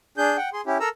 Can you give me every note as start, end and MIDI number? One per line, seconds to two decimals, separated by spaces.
0.18 0.37 62
0.18 0.37 68
0.18 0.37 91
0.37 0.49 78
0.37 0.49 79
0.53 0.61 68
0.53 0.61 84
0.66 0.78 61
0.66 0.78 64
0.66 0.78 67
0.80 0.89 69
0.80 0.89 70
0.80 0.89 82
0.80 0.89 88